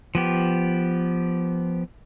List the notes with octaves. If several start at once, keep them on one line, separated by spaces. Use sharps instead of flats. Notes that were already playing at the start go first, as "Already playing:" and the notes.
F3 B3 G4